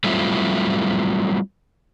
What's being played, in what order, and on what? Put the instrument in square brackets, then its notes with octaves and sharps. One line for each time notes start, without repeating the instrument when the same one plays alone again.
[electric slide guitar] F#3 G3 A3 C4 E4 F4